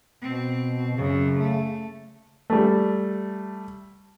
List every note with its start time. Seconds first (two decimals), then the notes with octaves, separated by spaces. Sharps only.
0.22 B2 C4
0.97 F#2 C#3
1.39 A3
2.50 G3 A3